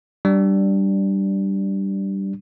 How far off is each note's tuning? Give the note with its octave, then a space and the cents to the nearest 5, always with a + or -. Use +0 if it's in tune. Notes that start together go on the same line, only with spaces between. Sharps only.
G3 -10 D4 +0